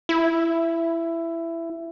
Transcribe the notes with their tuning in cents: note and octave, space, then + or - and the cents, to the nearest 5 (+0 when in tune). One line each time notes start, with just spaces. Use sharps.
E4 +15